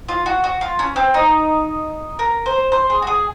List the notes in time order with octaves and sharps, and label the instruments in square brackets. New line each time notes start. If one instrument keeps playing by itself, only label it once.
[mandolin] F4
F#4
F#4
F4
C#4
C4
D#4
A#4
C5
C5
G#4
F#4
G#4